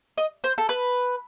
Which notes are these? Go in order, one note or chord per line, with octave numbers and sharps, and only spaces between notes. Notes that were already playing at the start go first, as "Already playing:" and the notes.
D#5
C5
A4
B4